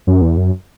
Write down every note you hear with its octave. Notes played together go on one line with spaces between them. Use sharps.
F#2
E2
F#2